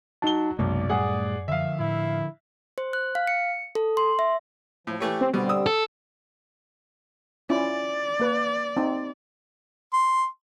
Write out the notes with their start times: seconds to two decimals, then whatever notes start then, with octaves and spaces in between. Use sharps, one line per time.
0.22 F#3 D#4 A5 G7
0.59 B1 F#2 C3 G#3 A#3 D5
0.89 A2 G3 A3 G#4 F#5 G#5
1.48 D3 F3 E5 F5
1.79 A2 E4
2.78 C5
2.93 F#6
3.15 F5
3.27 C#7
3.75 A4
3.97 C6
4.19 E5
4.87 A2 F3
5.00 E3 A3 G4 C#5
5.21 C4
5.34 B2 D3 G3 C4
5.49 D#6 E6
5.66 A4
7.50 C#4 E4 F4 D5
8.20 A#3 B4
8.77 C4 D#4
9.93 C6